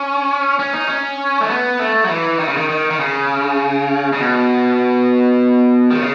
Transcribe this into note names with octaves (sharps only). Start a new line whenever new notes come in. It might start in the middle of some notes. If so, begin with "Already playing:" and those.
Already playing: C#4
C#4
D#4
C#4
A3
B3
A3
F#3
E3
D#3
C#3
D#3
D#3
D#3
C#3
C#3
B2
D#3
C#3